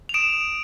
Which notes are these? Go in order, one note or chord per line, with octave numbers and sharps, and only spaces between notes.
F7
D#6 D7 E7